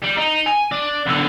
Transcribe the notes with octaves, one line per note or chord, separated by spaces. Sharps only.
G3
D#4
G#5
D4
B1 D3